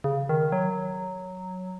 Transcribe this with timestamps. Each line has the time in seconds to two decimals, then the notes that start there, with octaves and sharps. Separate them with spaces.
0.04 C#3
0.29 D#3
0.52 F#3